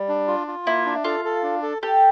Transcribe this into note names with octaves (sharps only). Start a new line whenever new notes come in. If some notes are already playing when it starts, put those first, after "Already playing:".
Already playing: G3
D4
F4
F4
A#3 E4
D4
F4 A4
A4
D4
A4
G4 A4